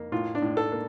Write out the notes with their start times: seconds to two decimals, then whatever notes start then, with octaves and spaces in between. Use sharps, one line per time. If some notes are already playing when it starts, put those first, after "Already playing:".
Already playing: F2 A#3
0.12 A2 F4
0.35 D4
0.42 A2
0.57 A4
0.72 A#3